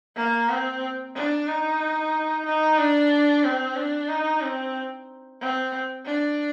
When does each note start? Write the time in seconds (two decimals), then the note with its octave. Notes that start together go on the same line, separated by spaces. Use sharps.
0.16 A#3
0.49 C4
1.15 D4
1.47 D#4
2.45 D#4
2.78 D4
3.44 C4
3.76 D4
4.09 D#4
4.42 C4
5.41 C4
6.06 D4